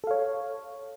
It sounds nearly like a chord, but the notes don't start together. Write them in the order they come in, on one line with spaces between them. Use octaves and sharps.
A4 F5 C#5